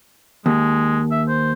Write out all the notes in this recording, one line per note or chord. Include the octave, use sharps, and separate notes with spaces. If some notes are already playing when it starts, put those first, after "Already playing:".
D#2 G#3
E5
C5